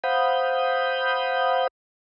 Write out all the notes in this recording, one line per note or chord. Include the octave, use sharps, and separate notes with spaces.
C5 F5 F#5 B5 D#6 G6